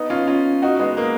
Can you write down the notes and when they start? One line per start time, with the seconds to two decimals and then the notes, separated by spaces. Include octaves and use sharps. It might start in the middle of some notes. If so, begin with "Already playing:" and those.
Already playing: B3 D#4
0.10 C#4 F4
0.27 C#4 F4
0.62 D#4 F#4
0.79 G#3 B3
0.97 A#3